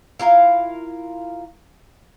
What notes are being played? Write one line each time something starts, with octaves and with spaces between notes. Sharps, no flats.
E4 F4 A#4 F5